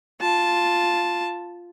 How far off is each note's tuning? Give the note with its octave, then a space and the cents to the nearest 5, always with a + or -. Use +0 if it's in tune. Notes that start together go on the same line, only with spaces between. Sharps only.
F4 +0 A5 +0